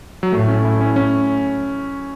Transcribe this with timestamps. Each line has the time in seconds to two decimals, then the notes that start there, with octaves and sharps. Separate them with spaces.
0.23 F#3
0.32 A2 A3
0.48 C#4
0.65 E4
0.81 C#4
0.96 C#4